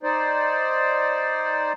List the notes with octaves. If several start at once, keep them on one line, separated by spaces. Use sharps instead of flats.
D#4 C5 D5